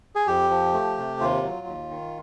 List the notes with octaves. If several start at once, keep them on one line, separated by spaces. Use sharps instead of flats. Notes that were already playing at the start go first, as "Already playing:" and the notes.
G#4
F2 G4
F3
A3
C3
D#2 F4
F#3
D#2
D#3